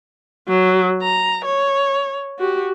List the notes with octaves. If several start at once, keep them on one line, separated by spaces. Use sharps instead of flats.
F#3
A#5
C#5
F#4 G4